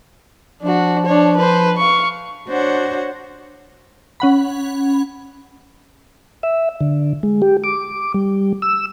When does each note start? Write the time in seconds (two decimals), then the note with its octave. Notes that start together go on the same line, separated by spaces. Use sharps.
0.62 F3 D4 F#4
1.06 D4 C#5
1.37 B4 C5
1.77 F5 C#6
2.48 D4 F#4 C5 C#5 F#5
4.20 C#4 F#5 B5
6.43 E5
6.81 D3
7.23 G#3
7.42 G4
7.64 D6
8.14 G3
8.62 E6